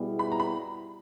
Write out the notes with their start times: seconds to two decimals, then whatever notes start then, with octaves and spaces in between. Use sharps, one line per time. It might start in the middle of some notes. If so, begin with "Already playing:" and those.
Already playing: B2 G3 B3 E4 G#4
0.19 B5
0.32 A#5
0.40 B5